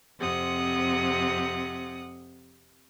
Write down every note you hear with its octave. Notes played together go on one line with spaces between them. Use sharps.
F2 C3 F#5 D#6